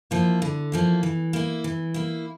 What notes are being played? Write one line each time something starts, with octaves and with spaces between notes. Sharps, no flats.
F3 A#3 E4
D3
F3 A#3 E4
E3
A#3 E4
E3
A#3 E4